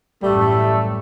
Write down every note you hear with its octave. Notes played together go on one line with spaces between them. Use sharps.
A1 F#2 G3 A3